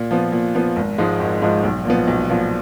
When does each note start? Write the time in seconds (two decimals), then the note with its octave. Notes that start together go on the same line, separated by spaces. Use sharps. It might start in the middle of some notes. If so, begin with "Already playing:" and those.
Already playing: A#2
0.11 F3 B3
0.32 A#2
0.55 F3 B3
0.76 G#1
0.98 G#2 F3 G#3 D#4
1.20 G#1
1.42 G#2 F3 G#3 D#4
1.63 B1
1.85 A#2 F3 B3
2.08 B1
2.30 A#2 F3 B3